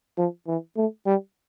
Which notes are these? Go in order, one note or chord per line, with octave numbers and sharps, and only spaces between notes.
F3
E3
A3
G3